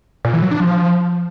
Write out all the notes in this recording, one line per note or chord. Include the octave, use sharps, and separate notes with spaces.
A#2
E3
F#3
D4
F3